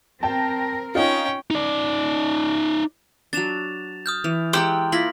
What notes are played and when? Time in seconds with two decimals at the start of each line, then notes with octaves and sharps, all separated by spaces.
0.23 C4 A#4 G5 A5
0.95 C#4 D#4 F4 G5
1.51 D#4 D5
3.33 F#3 D4 A6 E7 F7
4.06 D#6 F6 G6
4.24 E3 F7
4.53 G#3 G4 F#5 G5 A#5 C6 E6
4.92 A#3 E4 F4 A#6 B6 F#7